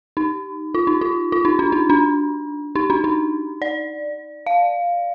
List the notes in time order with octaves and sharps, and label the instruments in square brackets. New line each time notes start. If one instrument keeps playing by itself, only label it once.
[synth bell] D#4
F4
D#4
F4
F4
D#4
D4
D#4
D4
D#4
D4
D#4
D5
F5